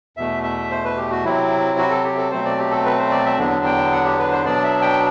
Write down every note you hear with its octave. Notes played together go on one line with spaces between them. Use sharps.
E2 B2 A3 E5
E5
C5
B4
G4
F#4
C3 F#3 C4 E4
F#4
A4
G4
A4
B2 F#3 A3 C4 C5
D5
G4
A4
B4
C5
D5
E5
E2 D3 F#3 B3 D4
G5
F#5
G4
B4
C5
B2 F#3 B3 D4 D5
E5
G5